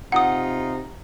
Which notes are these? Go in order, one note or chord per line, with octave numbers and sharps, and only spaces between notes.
C3 D#4 F4 F#5 D#6